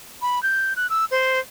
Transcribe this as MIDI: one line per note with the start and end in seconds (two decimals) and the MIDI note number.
0.22 0.42 83
0.43 0.73 91
0.76 0.89 90
0.90 1.05 88
1.11 1.39 72